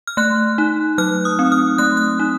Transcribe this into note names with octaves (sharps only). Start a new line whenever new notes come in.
F6
A3 F#6
D#4
F#3 F6
D#6
C4
F6
A3 F#6
F#6
D#4